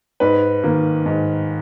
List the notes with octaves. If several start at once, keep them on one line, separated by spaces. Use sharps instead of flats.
G#2 B4
D#3 A#3
G#2